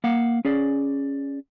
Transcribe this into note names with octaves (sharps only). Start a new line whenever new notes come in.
A#3 F5 F#5
C#4 G#4 D5